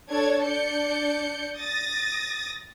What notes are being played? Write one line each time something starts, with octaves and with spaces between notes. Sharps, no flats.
D4 A4 C#5 A5 G#6
D4 D5 G6 C#7
D#6 A6 A#6